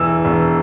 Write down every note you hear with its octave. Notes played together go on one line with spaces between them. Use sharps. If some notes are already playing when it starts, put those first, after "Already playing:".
Already playing: E1 E3 E6
E1